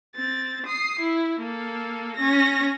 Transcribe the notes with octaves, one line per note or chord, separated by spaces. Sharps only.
C4 A6
D#6 C7
E4
A#3 A4
C#4 A#6